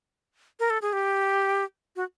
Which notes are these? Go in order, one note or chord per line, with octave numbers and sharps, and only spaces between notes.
A#4
A4
G#4
G4
F#4